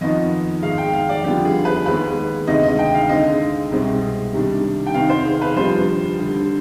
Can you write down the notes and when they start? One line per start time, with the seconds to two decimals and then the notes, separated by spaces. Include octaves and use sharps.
0.01 F2 D#3 B3 F4 D#5
0.62 G#2 D#3 G#3 F5
0.78 G5
0.93 F5
1.09 D5
1.24 F2 D3 G3 B3 F4 G4
1.45 G#4
1.65 B4
1.86 D#2 D#3 G#3 B3 B4
2.47 D2 C3 D#3 G#3 D4 D#5
2.63 D#5
2.79 G5
2.94 F5
3.09 D3 G#3 C4 D#4 D#5
3.71 C2 B2 G#3 C4
4.33 C3 D#3 G3 D4
4.87 G5
4.94 C3 D#3 B3 D#4 F5
5.10 C5
5.25 G#4
5.41 B4
5.56 F2 D#3 G3 D4 F4 C5
6.18 D3 G3 D4